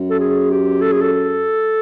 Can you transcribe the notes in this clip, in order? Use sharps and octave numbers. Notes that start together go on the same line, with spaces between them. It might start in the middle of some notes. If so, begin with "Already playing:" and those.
Already playing: F#2
A4
G#4
G4
A4
G#4
A4